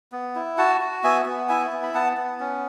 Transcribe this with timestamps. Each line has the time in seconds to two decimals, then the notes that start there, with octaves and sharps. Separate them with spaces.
0.12 B3
0.35 E4
0.58 F#4 F#5 A5
0.81 F#4
1.04 B3 E5 G#5
1.26 B3
1.49 E4 E5 G#5
1.72 B3
1.83 B5
1.94 B3 F#5 A5
2.17 B3
2.40 C#4